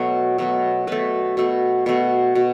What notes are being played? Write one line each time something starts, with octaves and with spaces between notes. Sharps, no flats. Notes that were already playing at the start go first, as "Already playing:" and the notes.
Already playing: B2 F#3 A3
B2 F#3 A3
B2 A3 B4
B2 A3
B2 A3
B2